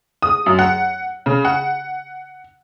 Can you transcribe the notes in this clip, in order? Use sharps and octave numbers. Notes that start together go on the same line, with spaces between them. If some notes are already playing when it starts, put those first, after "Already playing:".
D#6
F#2
F#5
C#3
F#5